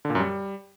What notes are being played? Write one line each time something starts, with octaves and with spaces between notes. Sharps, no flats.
D3
A#2
F#2
G3